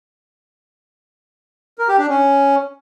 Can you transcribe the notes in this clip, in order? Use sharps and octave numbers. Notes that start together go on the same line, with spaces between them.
A#4
G4
D4
C#4